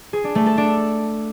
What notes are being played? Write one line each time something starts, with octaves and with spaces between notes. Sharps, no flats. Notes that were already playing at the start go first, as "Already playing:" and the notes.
G#4
D4
A3
A4
D4